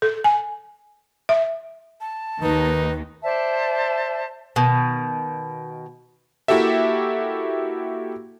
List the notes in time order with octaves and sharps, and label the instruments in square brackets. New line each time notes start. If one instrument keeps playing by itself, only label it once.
[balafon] A4
G#5
E5
[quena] A5
[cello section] D#2 D#3 [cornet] D#4 [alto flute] B4
[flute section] C5 D5 E5 A5
[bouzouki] B2 D#3
[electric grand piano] A#3 E4 F#4 G4 A4 E5